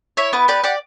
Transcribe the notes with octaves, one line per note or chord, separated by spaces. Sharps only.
E4 C#5 E5
B3 B4
G4 B4 D5
G4 D5 F#5